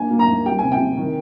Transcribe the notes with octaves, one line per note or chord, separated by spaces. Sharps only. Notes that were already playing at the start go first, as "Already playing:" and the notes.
Already playing: A#3 D4 G#5
A#3
A#5
D#2
G3 G5
C3 G#5
G5
C3
D#3